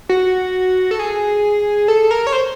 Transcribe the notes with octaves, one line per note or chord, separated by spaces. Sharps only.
F#4
A4
G#4
A4
A#4
C#5
C5